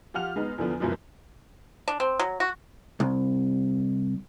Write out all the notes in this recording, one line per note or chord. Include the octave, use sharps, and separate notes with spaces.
F3 F4 G4 F#5 F6 F7
G#3 B3 D#4
E2 D3 F3 B3
F#1 C#2 F#2 B2 F3
D4
C4
F#3
F#4
C2